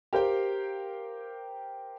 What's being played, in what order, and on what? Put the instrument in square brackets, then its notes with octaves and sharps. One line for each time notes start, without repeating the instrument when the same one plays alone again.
[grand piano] G4 A#4 C5 F5 G5